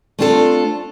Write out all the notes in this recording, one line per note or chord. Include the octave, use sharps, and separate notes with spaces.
A3 C4 D4 F4 G#4 A4